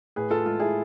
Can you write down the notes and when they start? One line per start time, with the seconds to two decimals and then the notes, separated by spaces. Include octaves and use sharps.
0.16 A2 G#4 B4
0.30 F4 A4
0.46 G#3 F4
0.60 E4 G#4